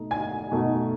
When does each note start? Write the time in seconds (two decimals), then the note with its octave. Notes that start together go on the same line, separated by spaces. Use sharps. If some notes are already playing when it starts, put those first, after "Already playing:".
Already playing: B2 A3 D#4
0.11 G#5
0.52 B2 A3 D#4